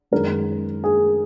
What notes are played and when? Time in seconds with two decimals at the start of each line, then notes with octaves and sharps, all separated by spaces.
0.11 F#2 D#3 G#3 D#4 A#4
0.84 G#4